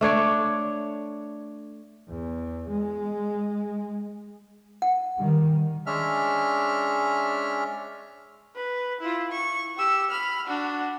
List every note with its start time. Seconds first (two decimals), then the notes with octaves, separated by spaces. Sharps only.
0.01 A3 D4 C#5 D5
2.09 E2
2.70 G#3
4.82 F#5
5.19 D#3 G3
5.86 G#3 C#4 D4 E5 F6
8.55 B4
9.01 E4 F4
9.31 C#6
9.78 G4 E6
10.11 B5 F6
10.47 D4 F#4